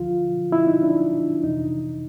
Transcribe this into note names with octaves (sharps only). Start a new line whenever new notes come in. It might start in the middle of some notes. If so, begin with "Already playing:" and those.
Already playing: D2 D3 F3 F4
E4
D#4
D4
F2 C3 E3 D#4